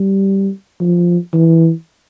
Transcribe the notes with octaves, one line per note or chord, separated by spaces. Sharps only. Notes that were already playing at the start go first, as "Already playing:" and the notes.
Already playing: G3
F3
E3